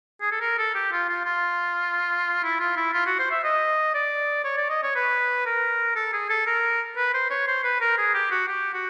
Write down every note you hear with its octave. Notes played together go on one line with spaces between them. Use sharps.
G#4
A4
A#4
A4
G4
F4
F4
F4
E4
F4
E4
F4
F#4
C5
E5
D#5
D5
C#5
D5
D#5
C#5
B4
A#4
A4
G#4
A4
A#4
B4
C5
C#5
C5
B4
A#4
G#4
G4
F#4
G4
F#4